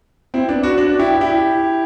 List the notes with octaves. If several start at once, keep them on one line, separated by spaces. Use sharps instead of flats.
C4 E4
B3 D4
D4 F#4
D4 F#4
E4 G4
E4 G4